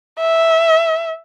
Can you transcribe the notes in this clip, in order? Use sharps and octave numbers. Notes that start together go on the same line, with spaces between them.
E5